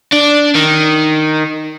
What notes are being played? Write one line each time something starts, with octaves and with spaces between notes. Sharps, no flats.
D4
D#3